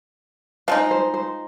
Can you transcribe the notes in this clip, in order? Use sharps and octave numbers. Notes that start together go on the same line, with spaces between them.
F3 G#3 D#4 F5
C5
C5